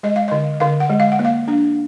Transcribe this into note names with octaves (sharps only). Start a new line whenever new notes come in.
G#3 D#5
F5
D3 D#5
D3 F5
F#5
G#3
F5
F#5
A#3
F5
D4